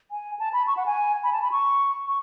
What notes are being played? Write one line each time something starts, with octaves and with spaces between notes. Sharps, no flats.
G#5
A5
B5
C#6
F#5
G#5
B5
A5
B5
C#6
C#6